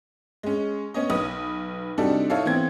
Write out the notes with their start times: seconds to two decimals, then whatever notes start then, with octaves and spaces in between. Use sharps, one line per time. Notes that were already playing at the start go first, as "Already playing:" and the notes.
0.43 G#3 C#4
0.94 B3 C#4 C#5 D#5
1.10 B1 B4 D#6
1.98 C3 G3 D4 D#4 F#4 A4
2.30 D#4 E4 A4 C#5 F5
2.45 E3 B3 C4 G#6